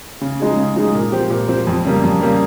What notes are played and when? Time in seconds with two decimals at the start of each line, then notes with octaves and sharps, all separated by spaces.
0.21 C#3
0.40 F3 G#3 D#4 G#4
0.57 C#3
0.76 F3 G#3 D#4 G#4
0.95 A#2
1.12 F3 C4 G4
1.30 A#2
1.48 F3 C4 G4
1.67 F2
1.85 C#3 G3 A#3
2.03 F2
2.21 C#3 G3 A#3